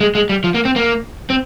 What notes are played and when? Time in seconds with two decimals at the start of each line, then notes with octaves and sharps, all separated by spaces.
0.01 G#3
0.15 G#3
0.29 G3
0.44 F3
0.55 A#3
0.65 C4
0.76 A#3
1.30 C4